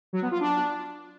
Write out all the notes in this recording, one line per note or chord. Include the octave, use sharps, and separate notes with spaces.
F#3
B3
F4
D4